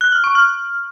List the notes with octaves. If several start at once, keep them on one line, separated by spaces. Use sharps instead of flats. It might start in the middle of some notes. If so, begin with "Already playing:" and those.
F#6
F6
C#6
F6